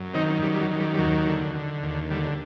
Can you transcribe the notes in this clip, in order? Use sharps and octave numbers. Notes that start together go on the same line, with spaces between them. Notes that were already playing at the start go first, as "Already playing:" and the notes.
Already playing: F#2
D#3 C4 D#4
F#2 G3
G3
F#3
D#3
G3
G3
D#2 F#3
D3
D3
D#2
D3 G3